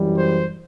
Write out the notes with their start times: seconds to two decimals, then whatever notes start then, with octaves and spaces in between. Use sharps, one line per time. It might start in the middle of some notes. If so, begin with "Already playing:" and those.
Already playing: F#2 E3 G3
0.18 C5